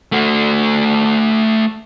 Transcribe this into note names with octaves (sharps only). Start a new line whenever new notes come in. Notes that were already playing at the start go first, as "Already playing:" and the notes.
A3 F#4